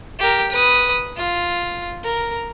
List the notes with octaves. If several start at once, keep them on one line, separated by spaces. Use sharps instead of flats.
G4 A#4
B4 D#6
F4
A#4